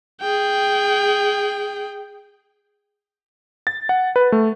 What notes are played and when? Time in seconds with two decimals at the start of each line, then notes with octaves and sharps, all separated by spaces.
0.21 G#4 G5
3.67 A6
3.89 F#5
4.16 B4
4.32 A3